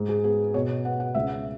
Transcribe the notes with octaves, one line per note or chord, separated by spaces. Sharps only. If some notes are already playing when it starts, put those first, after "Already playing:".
Already playing: G#2
G#4
B3 G#4
B2 C#5
B3 F#5
F#5
C#2 E5